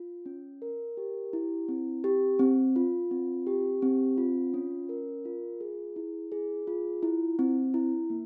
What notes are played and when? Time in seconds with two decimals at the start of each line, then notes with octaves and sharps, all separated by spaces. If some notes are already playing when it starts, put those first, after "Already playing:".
Already playing: F4
0.26 C#4
0.62 A#4
0.97 G4
1.33 E4
1.68 C4
2.04 G4
2.39 C4
2.76 F4
3.11 C4
3.47 G4
3.82 C4
4.18 F4
4.54 C#4
4.89 A#4
5.25 F4
5.61 G#4
5.96 E4
6.32 G#4
6.67 F4
7.03 E4
7.39 C4
7.74 E4
8.10 A#3